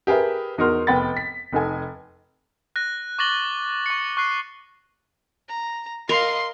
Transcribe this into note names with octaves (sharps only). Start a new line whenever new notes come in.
G4 G#4 A#4 B4 E5
E2 D#4 F#4 A#4 C6 F6
F1 B3 G5 B5 A6
B6
F1 D#4 A4 G#5
F#6 A#6
C#6 D6 A6 A#6 F#7 G7
C#6 C#7
C#6 F#6 C7
A#5
A#4 D#5 F5 C6